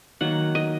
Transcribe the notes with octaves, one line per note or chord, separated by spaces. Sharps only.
D#3 F#3 A#3 F#5
D#5